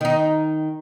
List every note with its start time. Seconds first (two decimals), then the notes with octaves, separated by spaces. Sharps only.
0.01 D#3 D#4